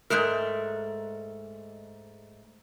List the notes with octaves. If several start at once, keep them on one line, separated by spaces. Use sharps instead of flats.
G#2 G#3 A3 A#4